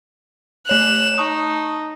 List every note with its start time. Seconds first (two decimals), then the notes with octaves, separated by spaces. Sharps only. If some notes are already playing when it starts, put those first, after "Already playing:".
0.68 A3 C#5 F#6 E7 F7
1.18 D#4 A5 C#6 D#6